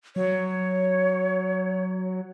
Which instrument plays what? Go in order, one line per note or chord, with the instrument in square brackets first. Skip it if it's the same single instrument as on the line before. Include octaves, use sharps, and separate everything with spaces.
[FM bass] F#3 [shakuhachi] C#5